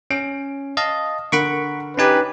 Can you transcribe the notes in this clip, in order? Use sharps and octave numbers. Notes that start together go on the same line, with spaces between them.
C#4 D7
D#5 F5 A5
D3 A#4 F#5 B5 C#6 D7
C#4 D#4 G4 B4 G#5